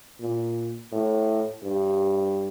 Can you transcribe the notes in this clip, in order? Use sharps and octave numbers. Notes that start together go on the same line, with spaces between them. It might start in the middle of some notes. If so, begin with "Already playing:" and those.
A#2
A2
G2